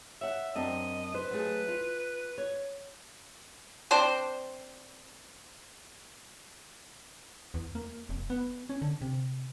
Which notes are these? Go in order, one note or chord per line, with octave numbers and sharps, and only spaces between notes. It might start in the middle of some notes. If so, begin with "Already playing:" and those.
C#5 E5 F#5
F#2 C4 D4 D#5
B4 C5
F#3 A3 G#4
F4
C#5
C4 D4 C5
E2
A#3
F1
B3
C#4
D3
C3